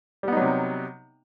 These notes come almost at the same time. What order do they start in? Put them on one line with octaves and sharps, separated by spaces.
G3 B3 D#4 F#3 C3